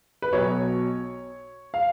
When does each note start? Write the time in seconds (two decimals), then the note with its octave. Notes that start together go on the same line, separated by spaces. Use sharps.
0.22 B4
0.33 B1 B2 F#3 C#5
1.74 F5